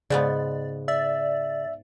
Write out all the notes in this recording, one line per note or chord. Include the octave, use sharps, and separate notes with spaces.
G#2 C#3 G#3 B3 D5
D5 E5